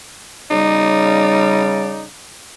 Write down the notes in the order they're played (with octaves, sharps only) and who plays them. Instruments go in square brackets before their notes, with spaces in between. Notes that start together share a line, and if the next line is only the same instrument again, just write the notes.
[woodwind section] C#3 G3 D5 [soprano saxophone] D#4